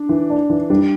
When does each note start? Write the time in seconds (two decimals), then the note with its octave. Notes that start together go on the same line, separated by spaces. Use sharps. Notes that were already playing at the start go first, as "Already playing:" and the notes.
Already playing: D4
0.09 E3
0.30 D4
0.50 E3
0.70 G3 D4